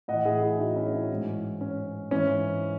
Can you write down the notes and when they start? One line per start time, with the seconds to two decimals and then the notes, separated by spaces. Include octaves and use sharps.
0.08 A2 E3 D#5 F#5
0.25 E4 G#4
0.42 E4 G#4
0.59 D#4 F#4
0.76 C#4 E4
0.93 C#4
1.11 G#2 E3
1.61 C#4
2.11 G#2 E3 C#4